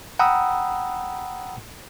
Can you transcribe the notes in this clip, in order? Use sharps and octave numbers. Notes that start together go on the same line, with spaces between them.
F#5 G5 A#5 B5 D#6 E6